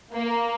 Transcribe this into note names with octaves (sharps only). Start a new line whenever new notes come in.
A#3